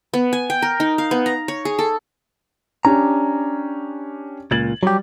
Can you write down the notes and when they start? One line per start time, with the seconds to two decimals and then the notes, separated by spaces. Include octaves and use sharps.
0.14 B3
0.33 G#5
0.50 G5
0.62 A#4
0.80 D#4
0.98 F5
1.11 B3
1.26 A#5
1.48 C#5
1.65 G#4
1.79 A4
2.85 C#4 D4 G4 A#5
4.51 C#2 A#2 G#6 A6 F#7
4.83 F#3 G3 G4